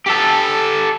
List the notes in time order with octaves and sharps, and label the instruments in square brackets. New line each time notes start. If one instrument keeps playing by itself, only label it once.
[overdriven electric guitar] G4 A4